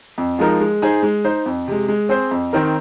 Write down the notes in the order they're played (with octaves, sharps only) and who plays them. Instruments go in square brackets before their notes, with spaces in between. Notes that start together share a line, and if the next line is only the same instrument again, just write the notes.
[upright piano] F2
F3 G#3 D#4 A#4
G#3
D#4 G#4 C5
G#3
D#4 C5
F2
C3 G#3
G#3
C4 G#4 C5
F2
D#3 C4 D#4 A#4